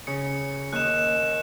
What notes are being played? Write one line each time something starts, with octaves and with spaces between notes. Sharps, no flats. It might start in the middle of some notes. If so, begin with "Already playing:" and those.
C#3 C#7
D#2 D#3 F#6 E7